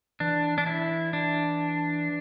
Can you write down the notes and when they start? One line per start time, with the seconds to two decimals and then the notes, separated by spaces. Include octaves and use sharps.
0.20 E3 D4
0.58 D4
0.66 E4
1.13 D4